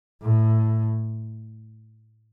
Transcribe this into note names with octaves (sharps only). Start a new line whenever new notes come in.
A2